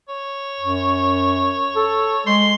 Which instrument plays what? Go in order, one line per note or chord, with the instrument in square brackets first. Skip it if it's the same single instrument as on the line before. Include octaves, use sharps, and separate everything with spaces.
[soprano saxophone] C#5
[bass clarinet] F#2
A4
[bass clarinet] G#3 [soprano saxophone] C6